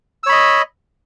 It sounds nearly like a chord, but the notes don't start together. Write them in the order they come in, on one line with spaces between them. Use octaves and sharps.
E6 C#5 B5 D#5